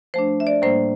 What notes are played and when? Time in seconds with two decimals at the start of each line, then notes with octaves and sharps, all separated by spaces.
0.14 F3 A3 D4 C5
0.40 E5
0.47 D5
0.62 A2 G3 A#3 D4 C5